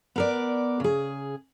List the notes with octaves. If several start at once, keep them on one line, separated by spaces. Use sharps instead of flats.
B3 A#4 D5
C#3 G#4